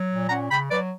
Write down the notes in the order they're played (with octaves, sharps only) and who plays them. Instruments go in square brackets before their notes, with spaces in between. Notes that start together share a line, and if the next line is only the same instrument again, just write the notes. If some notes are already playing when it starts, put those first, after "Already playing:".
Already playing: [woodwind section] F#3
A#2
C#4 F#5 A#5
C#3 G5 B5
F#3 B4 D5